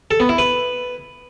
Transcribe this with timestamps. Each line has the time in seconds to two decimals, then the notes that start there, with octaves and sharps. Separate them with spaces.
0.11 A4
0.20 B3
0.29 E4
0.38 B4